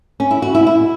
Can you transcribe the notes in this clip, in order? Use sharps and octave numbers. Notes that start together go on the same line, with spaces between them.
C#4
E4
F#4
E4
E4